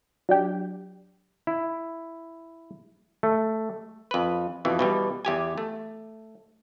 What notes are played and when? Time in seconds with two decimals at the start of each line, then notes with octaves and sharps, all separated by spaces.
0.29 F#3 D4 G4
1.47 E4
3.23 A3
4.11 F2 B4
4.65 F2 B2 E3
4.79 B2 E3 G3
5.25 E2 G4 G#5
5.58 A3